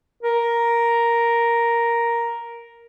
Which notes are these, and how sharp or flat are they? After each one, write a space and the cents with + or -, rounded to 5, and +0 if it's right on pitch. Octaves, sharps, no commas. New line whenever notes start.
A#4 +5